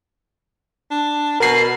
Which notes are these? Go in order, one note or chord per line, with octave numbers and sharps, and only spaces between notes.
D4
B2 A#4 C7